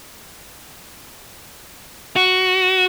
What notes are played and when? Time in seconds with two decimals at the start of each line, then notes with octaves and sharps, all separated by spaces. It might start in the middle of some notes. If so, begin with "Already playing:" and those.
2.16 F#4